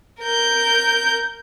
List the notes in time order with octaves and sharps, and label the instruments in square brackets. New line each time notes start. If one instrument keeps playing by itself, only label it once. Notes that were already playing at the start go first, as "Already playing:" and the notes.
[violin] A#4 G6